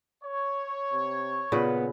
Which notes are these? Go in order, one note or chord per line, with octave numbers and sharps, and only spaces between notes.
C#5
C3
A#2 C#3 B3 B4